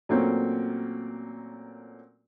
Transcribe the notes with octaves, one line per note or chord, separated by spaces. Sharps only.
A#2 F#3 A3 A#3 C4 C#4